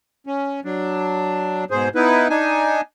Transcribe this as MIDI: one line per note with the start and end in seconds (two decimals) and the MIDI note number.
0.27 0.60 61
0.65 1.64 54
0.65 1.64 62
1.71 1.89 44
1.71 1.89 47
1.71 1.89 68
1.71 1.89 72
1.95 2.28 59
1.95 2.28 63
1.95 2.28 64
1.95 2.28 71
2.30 2.81 62
2.30 2.81 63
2.30 2.81 80